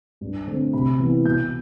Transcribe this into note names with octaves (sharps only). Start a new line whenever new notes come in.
G2
D3 A3 C4
C3 B5
E3 B3
B2 G6